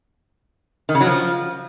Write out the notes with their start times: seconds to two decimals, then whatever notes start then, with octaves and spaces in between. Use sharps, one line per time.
0.89 D#3
0.95 C#3
1.01 F#3
1.07 F3